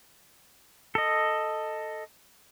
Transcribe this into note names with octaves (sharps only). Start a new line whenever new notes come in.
A4 D#5